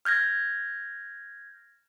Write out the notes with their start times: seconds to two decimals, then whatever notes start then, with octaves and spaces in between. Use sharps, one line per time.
0.05 F6 G6 G#6 A#6